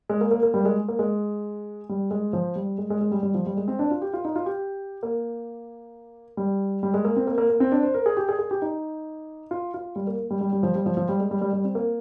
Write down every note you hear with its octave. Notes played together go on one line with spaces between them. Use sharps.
G#3
A#3
A#3
A#3
G3
A#3
G#3
A#3
G#3
G3
G#3
F3
G3
G#3
G#3
G#3
G3
G3
F3
G3
G#3
C4
D4
F4
G4
F4
D#4
F4
G4
A#3
G3
G3
G#3
A#3
C4
A#3
A#3
A#3
C4
D4
C5
A#4
G#4
G4
G#4
G#4
G4
D#4
F4
F4
G3
A#3
A#3
G3
G3
G3
F3
G3
F3
F3
G3
G#3
G3
G3
G3
C4
A#3